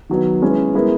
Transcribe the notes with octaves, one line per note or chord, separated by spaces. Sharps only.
D#3 F#3 B3 D#4
G#3 C#4 E4 B4
G#3 B3 E4 A#4